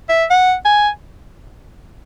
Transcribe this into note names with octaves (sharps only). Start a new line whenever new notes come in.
E5
F#5
G#5